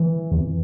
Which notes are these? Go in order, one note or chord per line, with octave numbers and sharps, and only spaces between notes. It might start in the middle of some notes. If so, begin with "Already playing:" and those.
Already playing: E3
E2
F2